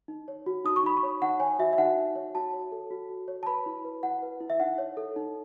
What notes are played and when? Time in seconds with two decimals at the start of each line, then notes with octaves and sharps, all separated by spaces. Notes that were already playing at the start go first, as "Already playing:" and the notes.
0.08 D#4
0.28 C#5
0.46 F#4
0.65 D#4 D#6
0.76 C#6
0.83 D#4 B5
0.97 C#6
1.03 C#5
1.22 D#4 F#5
1.40 C#5 G#5
1.59 F#4 E5
1.73 E5
1.78 D#4 F#5
1.97 D#4
2.15 C#5
2.34 F#4 A5
2.53 C#5
2.72 A4
2.90 F#4
3.09 F#4
3.28 C#5
3.43 A5
3.46 B4 B5
3.66 E4
3.85 B4
4.03 E4 F#5
4.22 B4
4.41 E4
4.50 E5
4.60 D#4 F#5
4.78 C#5
4.97 A4
5.16 D#4